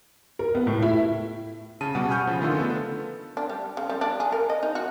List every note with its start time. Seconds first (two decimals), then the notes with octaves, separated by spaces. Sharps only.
0.39 A#4
0.55 B3
0.67 A2
0.82 E4
1.81 C#3 A5 D#7
1.95 B2 G3 F#5
2.08 F#5 G#5 B5 C#6 F6 G6
2.27 C#3 F3
2.41 D3 D#3 A3 F4
2.57 B3 A4
3.37 D4
3.49 G3
3.77 C#3
3.89 G3
4.01 D4
4.20 G#4
4.32 A#4
4.50 D#5
4.63 D#4
4.75 F#4